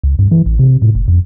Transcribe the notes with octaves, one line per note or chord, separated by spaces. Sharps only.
C#2
G2
E3
A1
C3
A2
F#1
F2